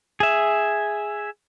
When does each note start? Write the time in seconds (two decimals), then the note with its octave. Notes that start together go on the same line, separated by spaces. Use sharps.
0.20 G#4 E5